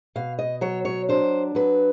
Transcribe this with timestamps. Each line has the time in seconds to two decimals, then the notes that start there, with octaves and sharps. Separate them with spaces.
0.16 B2 F5
0.39 D#5
0.61 F#3 C#5
0.85 C#5
1.09 D4 C5
1.55 F#3 B4